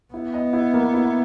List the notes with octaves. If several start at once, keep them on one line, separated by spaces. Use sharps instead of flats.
B3 E4
D#5
E4
A#3
E4